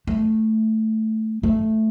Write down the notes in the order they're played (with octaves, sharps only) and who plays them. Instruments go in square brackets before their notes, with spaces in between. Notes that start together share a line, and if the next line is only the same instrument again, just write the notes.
[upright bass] A3
A3